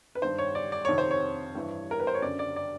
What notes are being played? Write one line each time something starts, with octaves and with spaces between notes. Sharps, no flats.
B4
G2 D#3 C5
C#5
D5
D5
F2 C3 D#3 C#5
C5
C#5
G2 E3
A#4
B4
C5
C#5
F#2 D3 D5
D5
D5